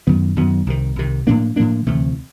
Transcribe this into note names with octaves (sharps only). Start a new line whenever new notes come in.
F#2 D#3 F#3 B3
F#2 D#3 F#3 B3
C2 C3 D#3
C2 C3 D#3
A2 F3 A#3 D4
A2 F3 A#3 D4
D2 C3 E3 A3